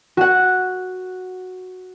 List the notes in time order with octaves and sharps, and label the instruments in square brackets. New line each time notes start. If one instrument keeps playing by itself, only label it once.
[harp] F#4 F#5